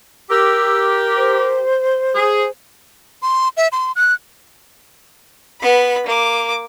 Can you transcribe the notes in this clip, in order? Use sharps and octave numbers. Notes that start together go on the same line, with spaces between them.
G4 A#4 E6
C5
G#4
C6
E5
C6
F#6
B3 B5
A#3 D6